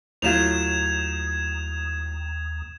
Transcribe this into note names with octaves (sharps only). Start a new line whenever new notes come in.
D#2 A2 F#3 F4 G#6 E7 F7